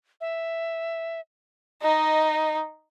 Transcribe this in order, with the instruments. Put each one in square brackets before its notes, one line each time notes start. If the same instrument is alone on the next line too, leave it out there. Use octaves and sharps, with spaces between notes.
[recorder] E5
[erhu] D#4 [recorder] D#5